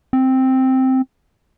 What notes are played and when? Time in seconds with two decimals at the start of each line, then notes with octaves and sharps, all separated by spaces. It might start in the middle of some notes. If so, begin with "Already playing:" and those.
0.13 C4